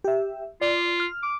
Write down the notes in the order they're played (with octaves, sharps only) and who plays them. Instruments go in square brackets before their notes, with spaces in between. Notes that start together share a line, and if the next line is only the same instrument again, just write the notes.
[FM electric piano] G4 E5
[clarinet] F4 [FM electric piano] D5
[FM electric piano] F6
[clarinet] D6